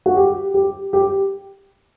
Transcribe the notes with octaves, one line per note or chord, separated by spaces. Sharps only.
F#4
G4
G4
G4